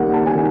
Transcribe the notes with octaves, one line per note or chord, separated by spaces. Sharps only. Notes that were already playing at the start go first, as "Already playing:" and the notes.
Already playing: D#3 G3 A#3 F#5
A5
G#5
D#3